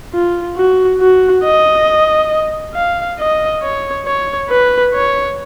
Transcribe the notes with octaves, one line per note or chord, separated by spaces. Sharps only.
F4
F#4
F#4
D#5
F5
D#5
C#5
C#5
B4
C#5